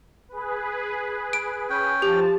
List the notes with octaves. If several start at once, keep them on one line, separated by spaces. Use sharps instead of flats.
G#4 B4
D7
C#4 G5
F3 G4 A5